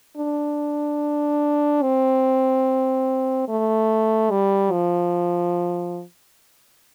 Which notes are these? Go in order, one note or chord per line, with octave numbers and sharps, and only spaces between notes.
D4
C4
A3
G3
F3